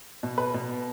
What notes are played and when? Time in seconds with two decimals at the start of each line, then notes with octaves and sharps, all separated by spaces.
0.23 B2
0.38 B4
0.54 B2